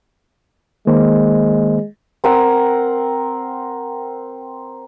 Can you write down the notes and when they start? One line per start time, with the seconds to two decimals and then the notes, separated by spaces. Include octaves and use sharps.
0.87 D#3 G#3 A#3 C5
2.24 C4 A#4 F#5